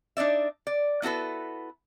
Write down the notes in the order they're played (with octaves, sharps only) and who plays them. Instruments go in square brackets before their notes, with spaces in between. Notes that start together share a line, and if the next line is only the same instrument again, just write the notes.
[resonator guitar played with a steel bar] D4 D#4 D5 E5
D5
B3 E4 F#4 A4 B4